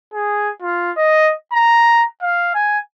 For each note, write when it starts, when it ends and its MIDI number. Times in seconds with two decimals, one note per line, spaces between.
0.14 0.50 68
0.62 0.92 65
0.97 1.33 75
1.53 2.05 82
2.22 2.54 77
2.55 2.79 80